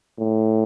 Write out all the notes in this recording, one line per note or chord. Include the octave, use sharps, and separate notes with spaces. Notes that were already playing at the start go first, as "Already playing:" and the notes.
A2